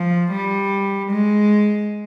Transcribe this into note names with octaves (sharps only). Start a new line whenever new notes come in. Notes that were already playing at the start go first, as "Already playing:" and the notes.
Already playing: F3
G3
G#3